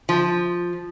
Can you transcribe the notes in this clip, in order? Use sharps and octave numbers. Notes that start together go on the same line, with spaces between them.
F3